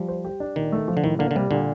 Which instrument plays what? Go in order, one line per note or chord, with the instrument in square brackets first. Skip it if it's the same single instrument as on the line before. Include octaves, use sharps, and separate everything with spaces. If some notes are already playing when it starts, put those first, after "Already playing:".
Already playing: [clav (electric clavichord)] F3 [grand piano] G3
[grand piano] C5
G4
D4
[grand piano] A#2 [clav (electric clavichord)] D#3
[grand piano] A3
F3
[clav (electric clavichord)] D3
[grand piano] A2 [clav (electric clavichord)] D#3
[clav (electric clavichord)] D3 [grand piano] A#3
[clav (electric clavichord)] D3
[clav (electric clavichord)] C3 [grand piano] G3
[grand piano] A#2 [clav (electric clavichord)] D3